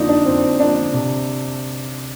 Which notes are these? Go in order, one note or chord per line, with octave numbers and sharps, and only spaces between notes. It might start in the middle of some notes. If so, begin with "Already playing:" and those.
Already playing: F2 D3 F3 A#3 D#4 D5 D#5
D4
F2 C4
D3 F3 A#3 D4
C3